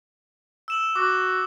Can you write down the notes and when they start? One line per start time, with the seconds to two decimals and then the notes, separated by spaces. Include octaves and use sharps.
0.68 E6 E7 F#7
0.95 F#4 D6